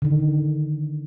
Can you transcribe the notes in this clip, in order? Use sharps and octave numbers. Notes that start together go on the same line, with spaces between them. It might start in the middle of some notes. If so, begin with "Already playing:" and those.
D3 D#3